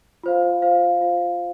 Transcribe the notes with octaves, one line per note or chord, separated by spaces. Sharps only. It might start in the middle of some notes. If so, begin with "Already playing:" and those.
F4 C5 F5
F4 C5 F5
F4 C5 F5